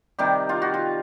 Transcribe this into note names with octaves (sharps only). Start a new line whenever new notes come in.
C3 D#3 G3 G4
F4
F#4
F4